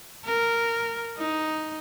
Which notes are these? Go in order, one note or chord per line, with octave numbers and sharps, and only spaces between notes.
A#4
D#4